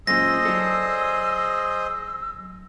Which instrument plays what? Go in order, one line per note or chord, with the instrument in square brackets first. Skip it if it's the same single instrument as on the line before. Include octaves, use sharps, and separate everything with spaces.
[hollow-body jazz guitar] F#2 A#2 [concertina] G#4 C5 D#5 [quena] E6 [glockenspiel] A#6
[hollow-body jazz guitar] F#3 D4 A4